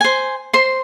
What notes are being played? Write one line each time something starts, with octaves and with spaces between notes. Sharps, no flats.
C5 G#5
C5 C6